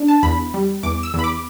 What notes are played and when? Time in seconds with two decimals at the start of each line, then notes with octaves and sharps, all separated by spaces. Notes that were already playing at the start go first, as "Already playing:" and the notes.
Already playing: D4
0.08 A5
0.23 E2 B5
0.54 G3
0.83 E2 D6
1.03 E6
1.14 E2 B5
1.24 D6